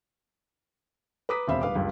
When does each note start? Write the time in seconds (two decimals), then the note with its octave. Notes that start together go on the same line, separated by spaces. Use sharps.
1.29 B4 A#5 D6 D#6 B6
1.48 E1 C3 C5 E5 F5 B5
1.61 D#1 B4 F5 D6
1.75 F#1 C#2 G2